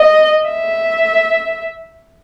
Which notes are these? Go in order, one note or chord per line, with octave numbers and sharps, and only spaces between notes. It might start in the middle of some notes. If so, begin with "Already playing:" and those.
Already playing: D#5
E5